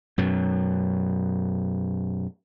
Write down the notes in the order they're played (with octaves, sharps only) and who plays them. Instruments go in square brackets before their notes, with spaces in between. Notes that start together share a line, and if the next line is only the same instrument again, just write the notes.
[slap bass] F#2 B2 F#3